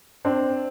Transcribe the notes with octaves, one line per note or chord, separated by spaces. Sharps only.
C4 D4